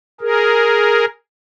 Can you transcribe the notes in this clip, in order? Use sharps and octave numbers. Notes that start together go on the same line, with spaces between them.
G#4 A#4